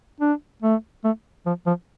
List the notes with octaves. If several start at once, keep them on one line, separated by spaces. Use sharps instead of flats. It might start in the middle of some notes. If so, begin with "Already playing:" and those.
D4
A3
A3
F3
F3